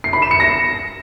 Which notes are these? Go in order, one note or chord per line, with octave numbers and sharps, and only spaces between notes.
C7
B5
E7
C#7
A#6